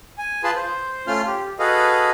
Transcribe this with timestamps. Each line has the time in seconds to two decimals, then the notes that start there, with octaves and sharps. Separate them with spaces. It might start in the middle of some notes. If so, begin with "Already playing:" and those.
0.18 G#5
0.44 F4 G#4 B4 A5 C6
0.56 C5
1.07 A3 C#4 F4 C6 F6
1.27 G4
1.59 F#4 G#4 A4 B4 D#5 F5